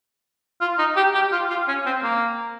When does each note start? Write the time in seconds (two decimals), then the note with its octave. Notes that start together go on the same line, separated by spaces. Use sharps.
0.61 F4
0.79 D#4
0.97 G4
1.14 G4
1.33 F4
1.50 F4
1.68 C#4
1.86 C4
2.04 A#3